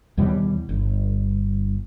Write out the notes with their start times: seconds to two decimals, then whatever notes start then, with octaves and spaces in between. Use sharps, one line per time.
0.17 D#2 B2 E3 G3
0.69 G1